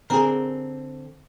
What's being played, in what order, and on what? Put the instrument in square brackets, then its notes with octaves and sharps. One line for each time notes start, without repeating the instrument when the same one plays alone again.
[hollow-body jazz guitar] D3 C4 [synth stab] G#4 A#4